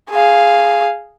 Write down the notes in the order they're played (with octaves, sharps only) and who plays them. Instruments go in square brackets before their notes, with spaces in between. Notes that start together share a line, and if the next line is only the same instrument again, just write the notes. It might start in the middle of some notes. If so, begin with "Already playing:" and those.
[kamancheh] G#4 F5